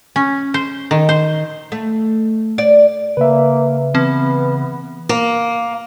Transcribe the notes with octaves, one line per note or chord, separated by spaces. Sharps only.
C#4
C5
D#3
C5
A3
D5
C#3 A#3 B4 E5
E3 B3 C4
A#3